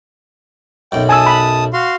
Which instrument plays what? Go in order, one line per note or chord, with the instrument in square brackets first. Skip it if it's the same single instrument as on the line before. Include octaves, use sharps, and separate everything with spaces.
[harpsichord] B1 F#2 [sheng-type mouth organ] G5
[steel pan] G#5 E6 [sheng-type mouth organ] A5 D#6
[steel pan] B5
[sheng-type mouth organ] F#4 F5 C6